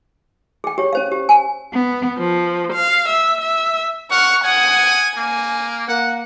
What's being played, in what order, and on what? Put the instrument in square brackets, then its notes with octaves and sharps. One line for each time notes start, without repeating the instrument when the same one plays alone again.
[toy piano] G#4 G5
G4 C#5
C#4 C5 F5
G4
G#5
[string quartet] B3
F3
F5
E5
E5
[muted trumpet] F#5 [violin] C#6 F6
[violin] F#5 D#6 [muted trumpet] G#5
[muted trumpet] A#3 [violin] G#5
[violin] A#3 [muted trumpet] F#5